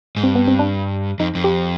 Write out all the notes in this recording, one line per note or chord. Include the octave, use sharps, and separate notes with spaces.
G#2
G2 C4
B3
C4
D4
F2 D#4
F2
G4